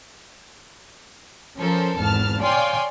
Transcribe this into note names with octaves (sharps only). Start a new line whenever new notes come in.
F3 C#4 A4 A#4 C5
G#1 E2 A5 F6
C#5 D5 F5 G5 G#5 C6